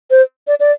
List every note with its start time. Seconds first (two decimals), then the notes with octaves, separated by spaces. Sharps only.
0.11 C5
0.47 D5
0.60 D5